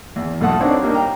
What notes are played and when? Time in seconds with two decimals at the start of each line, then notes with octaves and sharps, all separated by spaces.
0.16 E2
0.41 B1 A3 F4 A4 F#5 D#6
0.60 C4 D4 D#4 C#5 D5
0.82 G3 A#3 D4 D#4
0.95 G5 A#5